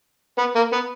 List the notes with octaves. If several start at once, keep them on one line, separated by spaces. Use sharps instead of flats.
B3
A#3
B3